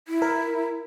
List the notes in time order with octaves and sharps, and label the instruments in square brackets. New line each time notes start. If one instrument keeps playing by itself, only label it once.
[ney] E4
[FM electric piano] A#4